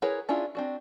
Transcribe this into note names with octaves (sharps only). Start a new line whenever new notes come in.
E4 G#4 A#4 B4 C#5
C#4 D4 E4 F4 G#4
C4 D4 F#4